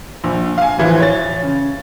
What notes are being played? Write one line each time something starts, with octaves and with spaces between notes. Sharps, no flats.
A#1
F5 G#5
D1 E3 F3
C#5 A6
C#3